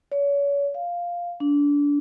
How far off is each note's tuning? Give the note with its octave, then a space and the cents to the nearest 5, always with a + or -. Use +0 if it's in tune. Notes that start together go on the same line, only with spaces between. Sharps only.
C#5 +35
F5 +0
D4 -25